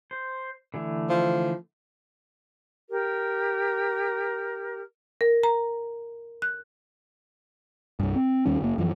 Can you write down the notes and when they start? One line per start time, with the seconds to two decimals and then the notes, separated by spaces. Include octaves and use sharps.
0.11 C5
0.74 D3 E3 A3
1.09 F3
2.89 G4 A#4
5.21 A#4
5.43 A#5
6.42 F#6
8.00 C2 G2
8.16 C4
8.46 D#2 D#3 G3 C#4
8.61 F#1 A#3
8.78 F#2 E3 F3